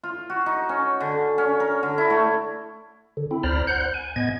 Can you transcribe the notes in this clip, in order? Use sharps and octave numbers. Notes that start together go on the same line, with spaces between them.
F4
F#4
D#4
C#4
D3
C#4
A#4
D3
E4
A3
D3
C4 E4
D2 C5 D5 A#5 B5 F6
C5 F#5 F#6 G6
G#5
A2 B3 D#5 G#6